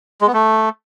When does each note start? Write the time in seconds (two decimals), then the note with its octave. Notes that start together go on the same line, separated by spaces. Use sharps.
0.21 G#3
0.27 B3
0.33 A3